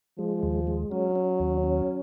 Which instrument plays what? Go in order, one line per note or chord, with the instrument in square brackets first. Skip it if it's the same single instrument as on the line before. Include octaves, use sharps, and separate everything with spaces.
[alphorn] F3 [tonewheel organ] G#3
[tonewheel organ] D#2
G#3
[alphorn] F#3 [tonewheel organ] C#4
[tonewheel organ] C#4
D#2
C#4